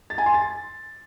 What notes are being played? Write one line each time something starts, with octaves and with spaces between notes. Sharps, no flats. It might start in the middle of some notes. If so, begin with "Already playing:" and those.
A6
G#5
C6
A6